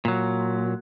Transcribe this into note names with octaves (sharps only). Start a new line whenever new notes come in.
A#2 F#3